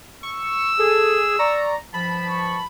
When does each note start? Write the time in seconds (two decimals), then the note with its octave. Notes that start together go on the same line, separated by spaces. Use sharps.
0.23 C#6 E6
0.79 G#4 A4
1.39 D5 A#5 C#6
1.94 G2 F3 A5 B5
2.29 C#6